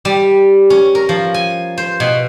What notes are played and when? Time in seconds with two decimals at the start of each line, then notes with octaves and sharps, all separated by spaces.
0.05 G3
0.70 C#4
0.95 A#4
1.09 F3
1.34 G#5
1.78 C5
2.00 B2